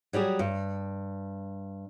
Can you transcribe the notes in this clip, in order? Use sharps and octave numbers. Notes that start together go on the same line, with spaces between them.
F#3 G3 G4 G#4
G2